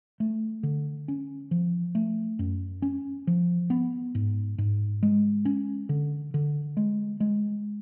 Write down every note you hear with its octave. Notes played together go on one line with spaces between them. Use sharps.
A3
D3
C#4
F3
A3
F#2
C#4
F3
B3
G#2
G#2
G#3
C#4
D3
D3
G#3
G#3